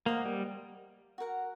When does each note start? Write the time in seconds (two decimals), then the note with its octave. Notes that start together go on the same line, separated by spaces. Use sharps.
0.06 A#3 C5 D#5 F#5
0.25 G3
1.18 F#4 A#4 F#5